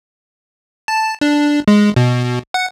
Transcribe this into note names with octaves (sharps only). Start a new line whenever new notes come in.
A5
D4
G#3
B2
F#5